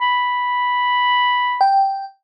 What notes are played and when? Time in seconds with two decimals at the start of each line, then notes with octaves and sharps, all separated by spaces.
0.01 B5
1.61 G5